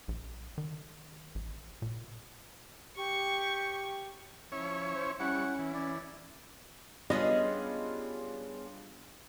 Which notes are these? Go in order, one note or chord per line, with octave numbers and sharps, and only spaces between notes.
A#1
D#3
A1
A#2
G4 C#6
F3 C#4 E4 C#5
C5
G3 C#4 E4 F#5 C#6
E3
C#4 D5
G3 B3 C#4 D4 F4 G#4 D#5